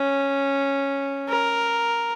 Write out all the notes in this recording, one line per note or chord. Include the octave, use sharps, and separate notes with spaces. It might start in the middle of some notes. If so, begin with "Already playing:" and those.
Already playing: C#4
A#4